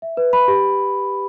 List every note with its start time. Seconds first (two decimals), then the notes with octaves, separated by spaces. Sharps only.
0.02 E5
0.17 B4
0.33 B5
0.48 G4